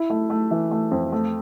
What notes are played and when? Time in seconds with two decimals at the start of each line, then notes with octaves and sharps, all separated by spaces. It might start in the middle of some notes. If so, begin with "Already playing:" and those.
Already playing: E4
0.10 A3
0.30 A3
0.51 E3
0.71 A3
0.91 F2
1.12 A3